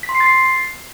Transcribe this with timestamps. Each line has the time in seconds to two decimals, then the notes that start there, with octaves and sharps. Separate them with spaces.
0.03 B6
0.09 C6
0.15 C7
0.20 A6
0.26 C7